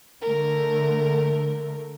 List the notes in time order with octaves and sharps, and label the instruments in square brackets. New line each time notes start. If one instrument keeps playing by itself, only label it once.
[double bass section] D3 A3 [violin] A#4